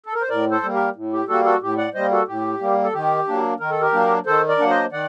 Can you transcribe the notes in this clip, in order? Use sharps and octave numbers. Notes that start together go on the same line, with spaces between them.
A4
A#4
C5
A2 A#4 D5
A4 C5
G3 A#3
G4 A#4
A2
G4
G3 A#3 F#4 A4
F#4 A4
A2 G4
D5 F#5
G3 A#3 C5 D#5
F#4 A4
A2 G4
G3 A#3
A4
D#3 G4
F#3 A#3 D4
D#3 A#4
A4
G4 A#4
F#3 A#3 D4
D#3 A4 C5
A#4 D5
F#3 A#3 D4 F#5
C5 D#5
D#3 D5 F#5